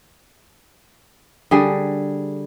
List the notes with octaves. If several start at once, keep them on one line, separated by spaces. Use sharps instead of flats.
D3 G3 G#4